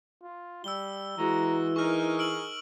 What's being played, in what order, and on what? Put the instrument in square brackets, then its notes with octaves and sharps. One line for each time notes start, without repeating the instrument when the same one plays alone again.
[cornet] F4
[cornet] G3 [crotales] E6 G7
[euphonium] E3 [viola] G#3 F#4 [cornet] A#5
[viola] D#4 A#4 [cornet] G#4 [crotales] C#6 F6
[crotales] E6 D7 F#7